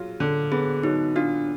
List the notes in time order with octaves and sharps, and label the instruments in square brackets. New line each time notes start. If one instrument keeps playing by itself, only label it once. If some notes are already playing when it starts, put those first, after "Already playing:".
Already playing: [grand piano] F#3 F4 [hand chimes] G#4
[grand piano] D3
[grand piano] B3 [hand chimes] G#4
[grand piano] F#3 [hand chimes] D#4
[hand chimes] D4 [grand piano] F4